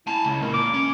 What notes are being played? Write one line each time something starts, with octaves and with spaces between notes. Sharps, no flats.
E4 G#5 A5
C#2
A#2 A#4
D6
C#4